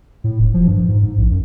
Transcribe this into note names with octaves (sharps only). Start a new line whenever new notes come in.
A2
E1
F3
G2
G#2
G#2
A#1
F#2